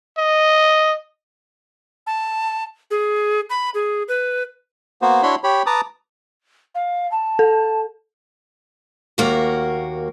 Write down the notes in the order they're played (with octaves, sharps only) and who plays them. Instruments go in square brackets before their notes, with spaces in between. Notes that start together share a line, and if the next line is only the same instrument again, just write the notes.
[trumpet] D#5
[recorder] A5
G#4
B5
G#4
B4
[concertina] A#3 B3 F#4 C5
D4 E4 F#4 C#5 B5 C6
G4 C#5 B5
B4 A5 A#5 D6 D#6
[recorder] F5
A5
[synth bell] A4
[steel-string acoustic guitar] D#2 A#3 F#4